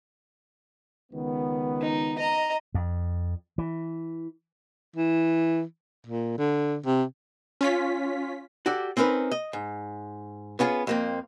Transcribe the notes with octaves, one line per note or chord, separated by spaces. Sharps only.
C#2 D#3 B3
D#4
D#5 A#5
F2
E3
E3
A#2
D3
C3
C#4 F4 B6
F#4 G4 A4 D5
C4 C#4 D#4 A#4 B4
D#5
G#2
B3 C#4 F4 G4 G#4
F2 A#3 C4